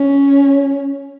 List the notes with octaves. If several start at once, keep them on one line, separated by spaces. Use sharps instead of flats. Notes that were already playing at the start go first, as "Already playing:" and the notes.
Already playing: C#4